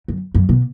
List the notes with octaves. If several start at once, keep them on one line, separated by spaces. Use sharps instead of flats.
F#2
F#2
B2